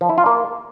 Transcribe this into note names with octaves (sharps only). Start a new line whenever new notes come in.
F3
E4
F4
A#3